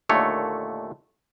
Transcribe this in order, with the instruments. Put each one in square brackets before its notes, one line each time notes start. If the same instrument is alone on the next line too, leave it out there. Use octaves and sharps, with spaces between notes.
[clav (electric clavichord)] D#2 A#2 D3 A3 C#5